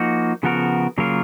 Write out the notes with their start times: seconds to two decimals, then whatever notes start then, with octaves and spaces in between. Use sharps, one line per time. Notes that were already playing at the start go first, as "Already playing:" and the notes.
Already playing: F3 A#3 D#4 F#4
0.43 C#3 F3 B3 F#4 A#4
0.98 C#3 F#3 A#3 F4 A#4